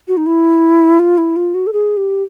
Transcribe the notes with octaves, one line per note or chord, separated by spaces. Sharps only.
F#4
D#4
E4
F4
E4
F4
F#4
A4
G#4
G4